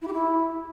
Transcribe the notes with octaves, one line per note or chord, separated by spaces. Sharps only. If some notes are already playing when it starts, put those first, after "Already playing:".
E4
G4
E4